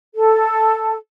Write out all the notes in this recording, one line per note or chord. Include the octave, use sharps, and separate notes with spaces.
A4